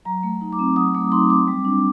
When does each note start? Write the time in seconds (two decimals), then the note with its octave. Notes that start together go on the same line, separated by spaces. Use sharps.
0.05 F#3 A#5
0.23 A3
0.41 D#4
0.53 D6
0.59 C4
0.76 F#3 D#6
0.94 A3 D6
1.12 D#4 C6
1.30 C4 D6
1.48 G3
1.65 D4